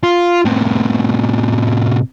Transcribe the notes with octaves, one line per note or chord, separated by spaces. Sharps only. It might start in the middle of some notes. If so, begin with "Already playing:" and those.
F4
A2 C3